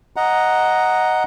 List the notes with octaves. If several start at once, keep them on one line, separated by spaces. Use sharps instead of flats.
D#5 F#5 A#5